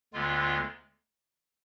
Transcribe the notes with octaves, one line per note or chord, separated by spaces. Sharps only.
D2 D3 G#3 B3 F4